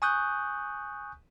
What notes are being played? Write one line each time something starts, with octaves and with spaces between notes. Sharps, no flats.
G#5 C#6 D#6 F#6 G6